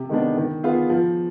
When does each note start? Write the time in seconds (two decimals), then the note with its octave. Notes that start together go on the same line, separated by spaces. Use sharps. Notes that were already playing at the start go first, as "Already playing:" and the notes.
Already playing: C3
0.09 D#3 G#3 B3 D4
0.37 D#3
0.63 B3 F4 G#4
0.90 F3